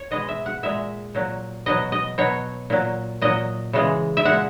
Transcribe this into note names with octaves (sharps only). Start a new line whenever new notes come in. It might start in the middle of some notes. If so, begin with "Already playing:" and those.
Already playing: C#5
B2 G#3 D#5
E5
F#5
A#2 G#3 E5
A#2 F#3
B2 F#3 D#5
D#5
B2 F#3 C#5
A#2 F#3
A#2 F#3 D#5
C#3 E3 G#3
E5
A#2 G#3 F#5